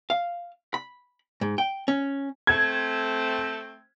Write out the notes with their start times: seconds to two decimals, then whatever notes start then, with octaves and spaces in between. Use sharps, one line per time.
0.10 F5
0.74 B5
1.41 G#2
1.58 G5
1.88 C#4
2.47 A3 C4 G#6